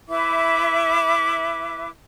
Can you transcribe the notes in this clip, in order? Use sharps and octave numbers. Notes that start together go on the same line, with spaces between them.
E4 B4 E5 D6